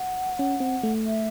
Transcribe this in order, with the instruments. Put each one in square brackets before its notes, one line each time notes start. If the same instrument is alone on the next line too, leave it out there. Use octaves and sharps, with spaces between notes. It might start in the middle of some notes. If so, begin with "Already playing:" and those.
Already playing: [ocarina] F#5
[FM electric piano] C#4
C4
A3
[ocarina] E5